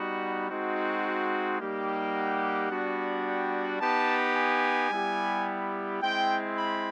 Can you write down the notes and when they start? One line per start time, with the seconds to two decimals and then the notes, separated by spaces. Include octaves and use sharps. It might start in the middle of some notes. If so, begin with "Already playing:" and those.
Already playing: G3 B3 D#4 F#4
0.50 G#3 C4 D#4 F#4
1.60 G3 A#3 D#4 G4
2.15 F#5
2.70 G3 B3 D4 F#4
3.26 G5
3.80 B3 D#4 G4 A5
4.35 G#5
4.90 G3 B3 E4 G4
6.01 G#3 C4 E4 G5
6.56 B5